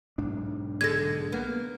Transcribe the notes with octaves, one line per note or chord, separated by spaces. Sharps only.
B1 G#2 D4
D3 G#3 A4 G#6 A#6
A#3 B3